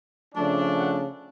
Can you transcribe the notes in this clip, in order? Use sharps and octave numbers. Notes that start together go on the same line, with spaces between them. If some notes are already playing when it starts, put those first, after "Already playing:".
C#3 F3 A3 D4
F#5